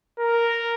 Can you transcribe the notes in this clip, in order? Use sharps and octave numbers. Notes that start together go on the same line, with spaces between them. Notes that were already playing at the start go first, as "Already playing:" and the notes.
A#4